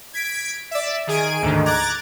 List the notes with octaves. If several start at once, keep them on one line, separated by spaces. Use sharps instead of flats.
G#6 B6 D7
D5 E5
D#3 G#4 G#5 D7
D2 G#2 D3 D#3
A#5 D6 F#6 G#6 A6